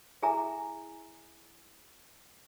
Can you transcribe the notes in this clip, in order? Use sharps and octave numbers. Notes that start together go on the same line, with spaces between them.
E4 G#4 E5 G#5 A#5 D6